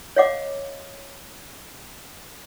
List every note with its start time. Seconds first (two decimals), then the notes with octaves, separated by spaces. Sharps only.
0.16 C#5 D#5 F5 F#5 D6